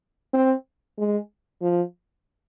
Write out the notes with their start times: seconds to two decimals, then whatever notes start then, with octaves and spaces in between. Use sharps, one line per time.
0.34 C4
0.98 G#3
1.62 F3